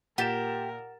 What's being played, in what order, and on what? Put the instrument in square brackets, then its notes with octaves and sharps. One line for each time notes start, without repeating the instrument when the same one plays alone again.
[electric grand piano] A#2 A6 E7 [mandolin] G4 [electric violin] A#4 [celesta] F#5